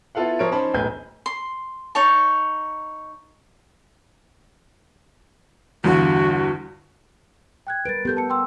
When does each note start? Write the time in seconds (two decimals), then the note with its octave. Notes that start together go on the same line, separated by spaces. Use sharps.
0.15 B3 E4 F4 A4 F5 F#5
0.39 F3 A#4 C#5 D7
0.52 C#4 D#4 C5 A5 B5
0.74 E1 B1 A2 B4 G#5 G6
1.26 C6
1.95 D#4 C#5 A5
5.84 E2 G2 D3 F#4
7.67 G5 F#6 G#6
7.85 G3 A#4 B4 A6 D7
8.05 B3 G4 A4 G6
8.17 A5 C#7
8.30 G5 C6 E6